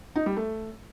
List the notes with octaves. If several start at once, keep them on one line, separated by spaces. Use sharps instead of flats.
D#4
G3
A3